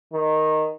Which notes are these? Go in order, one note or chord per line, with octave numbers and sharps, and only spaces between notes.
D#3